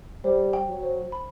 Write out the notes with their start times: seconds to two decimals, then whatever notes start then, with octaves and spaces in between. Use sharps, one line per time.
0.24 G3 C5
0.53 G5
0.69 F#3
0.83 C5
1.12 B5